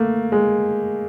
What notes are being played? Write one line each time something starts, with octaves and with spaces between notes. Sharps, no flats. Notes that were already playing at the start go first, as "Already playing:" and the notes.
Already playing: A3 A#3
G#3